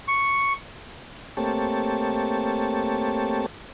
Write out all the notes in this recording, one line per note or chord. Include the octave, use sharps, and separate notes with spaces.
C#6
A3 A#3 C4 G4 C#5 A5